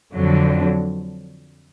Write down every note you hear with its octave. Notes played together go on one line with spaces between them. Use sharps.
F2 D3 F#3